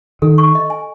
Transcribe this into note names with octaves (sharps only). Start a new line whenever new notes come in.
D#3 A4
C#6
D#5
G#5